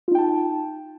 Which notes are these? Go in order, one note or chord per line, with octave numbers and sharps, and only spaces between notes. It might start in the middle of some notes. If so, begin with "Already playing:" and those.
D#4 F4 G5 A5